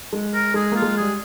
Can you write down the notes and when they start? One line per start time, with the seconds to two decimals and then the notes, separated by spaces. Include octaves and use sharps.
0.13 G#3
0.34 A#4
0.54 G#3 G#4
0.72 A#3 F4
0.82 G#3
0.97 G3 G#4